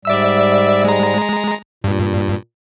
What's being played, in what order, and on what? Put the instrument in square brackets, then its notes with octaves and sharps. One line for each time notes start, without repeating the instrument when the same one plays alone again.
[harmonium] G#2 G3 [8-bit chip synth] D5 E5 E6
[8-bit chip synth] G#3 A#5
[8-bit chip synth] G2 [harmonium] A#2